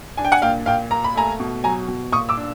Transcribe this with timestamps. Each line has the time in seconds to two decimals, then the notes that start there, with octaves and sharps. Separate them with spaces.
0.17 D4 G#5
0.25 G5
0.32 F#5 G#5
0.42 A#2 F5 G5
0.66 A#2 F5 G5
0.91 A#3 A#5
1.04 B5
1.15 A3 G#5 A#5
1.40 B2
1.64 F#3 G#5 A#5
1.88 B2
2.12 A#2 C#6 D#6
2.29 D6 E6
2.37 D4